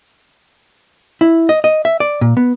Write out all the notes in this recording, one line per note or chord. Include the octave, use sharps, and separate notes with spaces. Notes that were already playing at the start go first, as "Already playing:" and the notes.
E4
D#5
D#5
E5
D5
A#2
B3